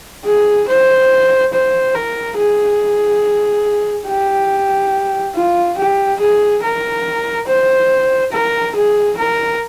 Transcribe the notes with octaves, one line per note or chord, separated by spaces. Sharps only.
G#4
C5
C5
A#4
G#4
G4
F4
G4
G#4
A#4
C5
A#4
G#4
A#4